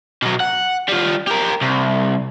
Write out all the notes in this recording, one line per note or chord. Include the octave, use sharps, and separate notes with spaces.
B2 F#3
F#5
G3 F4
G4 A#4
C2